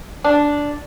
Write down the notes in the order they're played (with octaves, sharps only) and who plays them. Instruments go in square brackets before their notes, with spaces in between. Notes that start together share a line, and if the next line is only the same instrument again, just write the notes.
[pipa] D4